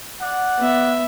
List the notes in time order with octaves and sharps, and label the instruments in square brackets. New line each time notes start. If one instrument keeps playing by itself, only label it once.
[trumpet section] D5 F#5
[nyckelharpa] B3 E5